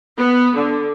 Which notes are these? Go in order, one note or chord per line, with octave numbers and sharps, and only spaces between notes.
B3
D3